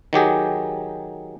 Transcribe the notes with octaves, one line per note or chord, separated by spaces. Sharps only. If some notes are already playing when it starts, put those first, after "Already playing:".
D#3 F#3 G4 G#4